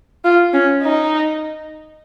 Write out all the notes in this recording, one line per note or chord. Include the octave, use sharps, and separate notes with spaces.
F4
C#4
D#4